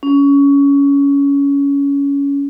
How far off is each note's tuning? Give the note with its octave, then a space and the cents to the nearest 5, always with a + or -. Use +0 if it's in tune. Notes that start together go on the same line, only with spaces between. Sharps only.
C#4 +20